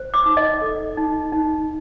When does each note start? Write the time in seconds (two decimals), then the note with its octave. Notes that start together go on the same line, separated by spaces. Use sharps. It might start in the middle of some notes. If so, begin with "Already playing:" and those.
Already playing: C5
0.14 D6
0.26 D#4
0.37 D#5
0.61 A4
0.97 D#4
1.32 D#4